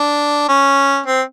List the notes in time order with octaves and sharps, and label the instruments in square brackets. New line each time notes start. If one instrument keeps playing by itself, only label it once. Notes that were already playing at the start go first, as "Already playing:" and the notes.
Already playing: [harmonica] D4
C#4
C4